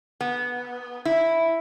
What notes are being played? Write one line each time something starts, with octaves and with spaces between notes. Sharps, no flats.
B3
E4